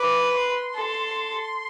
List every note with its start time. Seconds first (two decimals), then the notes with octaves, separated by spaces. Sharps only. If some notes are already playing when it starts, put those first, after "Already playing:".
Already playing: B4 D6
0.35 C6
0.75 A4